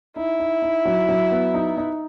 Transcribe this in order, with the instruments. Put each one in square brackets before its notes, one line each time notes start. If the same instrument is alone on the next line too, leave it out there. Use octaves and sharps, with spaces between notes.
[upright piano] D#4 [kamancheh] E4
[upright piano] D#4
D#4
F#3
F#3
B3
D#4
D#4